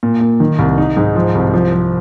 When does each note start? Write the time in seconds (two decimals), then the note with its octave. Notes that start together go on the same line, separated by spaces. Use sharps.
0.03 A#2
0.21 A#2
0.40 D#3
0.59 C2
0.78 D#4
0.97 G#2
1.15 F3
1.35 C2
1.54 F3
1.72 F3